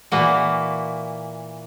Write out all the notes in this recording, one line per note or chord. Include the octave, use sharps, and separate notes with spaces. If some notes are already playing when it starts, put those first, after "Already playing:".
A#2 E3 A#3 F#4